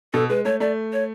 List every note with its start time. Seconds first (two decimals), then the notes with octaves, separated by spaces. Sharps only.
0.13 B2 A4
0.29 G#3 B4
0.45 A3 C#5
0.60 A3 D5
0.93 C#5